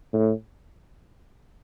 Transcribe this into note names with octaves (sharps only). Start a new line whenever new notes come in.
A2